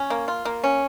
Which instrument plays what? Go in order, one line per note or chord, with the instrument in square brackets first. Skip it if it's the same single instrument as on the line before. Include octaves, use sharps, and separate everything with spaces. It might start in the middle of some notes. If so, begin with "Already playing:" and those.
Already playing: [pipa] C#4
A#3
F4
A#3
C#4